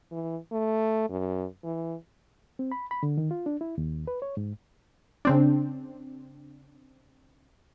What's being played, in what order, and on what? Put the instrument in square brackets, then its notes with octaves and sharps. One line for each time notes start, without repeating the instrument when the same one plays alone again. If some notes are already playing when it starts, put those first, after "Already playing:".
[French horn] E3
A3
F#2
E3
[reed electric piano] C4
B5
B5
D3
D#3
F4
D4
E4
D#2
B4
C#5
G#2
[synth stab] C#3 C4 D4